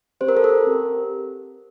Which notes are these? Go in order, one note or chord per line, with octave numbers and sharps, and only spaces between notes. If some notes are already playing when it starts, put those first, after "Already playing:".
C4 G4 C5
A#4
A4
A#4
C4 G4